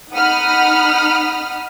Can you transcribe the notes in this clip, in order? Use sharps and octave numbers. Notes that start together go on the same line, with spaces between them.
D#4 F#5 B5 D#6 F6